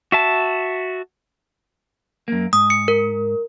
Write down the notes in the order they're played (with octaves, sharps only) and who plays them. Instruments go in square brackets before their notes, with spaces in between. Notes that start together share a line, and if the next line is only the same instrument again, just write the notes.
[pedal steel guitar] F#4 E5 A5
[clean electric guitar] F#2 A#3
[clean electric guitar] G#2 [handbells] D#6
[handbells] C#7
A#4